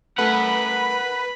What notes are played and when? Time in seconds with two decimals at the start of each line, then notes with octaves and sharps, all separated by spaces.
0.18 A3 A#4 B4 F#5 B5